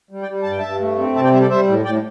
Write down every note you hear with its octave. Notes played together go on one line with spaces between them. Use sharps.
G3
D5 G5
G3
G2 A5
G5
G2 E5 A5
A3
C4
C3 E5 A5
D5 G5
G3 C5 E5
A4 D5
G3 C5 E5
A2
A2 D5 G5